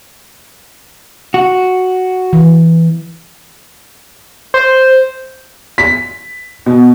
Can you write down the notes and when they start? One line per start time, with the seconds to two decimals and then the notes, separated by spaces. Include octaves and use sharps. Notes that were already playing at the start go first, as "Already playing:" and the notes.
1.34 F#4
2.33 E3
4.54 C5
5.78 B6
6.66 B2